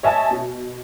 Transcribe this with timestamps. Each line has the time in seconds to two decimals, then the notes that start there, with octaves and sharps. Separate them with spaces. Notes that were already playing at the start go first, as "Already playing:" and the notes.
0.03 C#5 D#5 E5 G#5 A5
0.31 B2